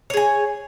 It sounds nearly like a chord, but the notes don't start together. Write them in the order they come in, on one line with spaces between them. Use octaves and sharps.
C#5 G#4 G#5